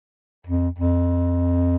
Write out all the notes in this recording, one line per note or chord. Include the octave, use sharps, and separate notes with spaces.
F2
F2